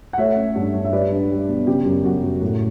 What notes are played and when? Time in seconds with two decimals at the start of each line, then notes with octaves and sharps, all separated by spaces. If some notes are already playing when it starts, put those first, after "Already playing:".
0.13 F#5
0.18 A3 C#5 E5
0.36 C#4
0.55 G2
0.74 G2
0.85 E5
0.92 G3 B4 D5
1.12 D4
1.30 G3
1.49 B2
1.67 C#3 G4
1.85 F#2
2.04 F#2 F#4
2.23 F#2
2.41 A2